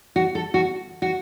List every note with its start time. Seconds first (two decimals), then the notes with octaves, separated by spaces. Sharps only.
0.16 F#4
0.35 A4
0.54 F#4
1.02 F#4